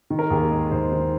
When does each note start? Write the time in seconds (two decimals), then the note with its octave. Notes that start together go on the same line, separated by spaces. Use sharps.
0.10 D#3
0.19 A#4
0.30 D#2 G#4
0.51 G#3 G#4
0.71 D#2 C5
0.92 D#3